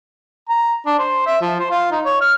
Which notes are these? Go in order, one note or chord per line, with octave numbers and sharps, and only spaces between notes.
A#5
D4
C5
E5
F3
C5
F4
D#4
C#5
F6